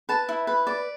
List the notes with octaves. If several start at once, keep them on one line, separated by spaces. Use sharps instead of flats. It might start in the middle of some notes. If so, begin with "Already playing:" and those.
B4 A5
E4
B4
D5